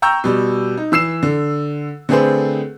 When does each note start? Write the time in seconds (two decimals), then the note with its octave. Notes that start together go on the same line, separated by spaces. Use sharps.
0.02 G5 A#5 C#6 E6 G6
0.24 B2 G3
0.77 D#4
0.92 E3 E6 C7 E7
1.23 D3
2.09 D3 A3 C4 G#4 B4 C5